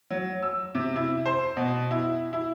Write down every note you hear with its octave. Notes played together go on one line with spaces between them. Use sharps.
F#3
E6
C3
E4
C5
B2
E4
E4